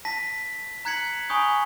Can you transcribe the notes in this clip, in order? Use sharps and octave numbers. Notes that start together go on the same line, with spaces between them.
A5 A#6 B6
A#5 F#6 G#6 B6 C#7 F#7
G#5 B5 C#6 D#6 G6